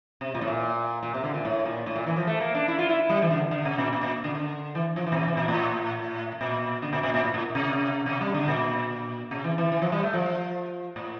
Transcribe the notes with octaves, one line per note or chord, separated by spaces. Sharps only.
C3
A#2
A2
A#2
A#2
C3
D3
A#2
A2
A#2
A2
A#2
E3
F3
A3
A#3
D4
E4
F4
E4
G3
E3
D3
D3
C3
A#2
A#2
A#2
D3
D3
E3
F3
E3
A#2
C3
E3
A#2
A2
A#2
D3
A#2
A#2
A#2
A2
A2
C3
C3
G3
D3
A#2
C3
E3
E3
E3
F3
G3
A3
F3
A2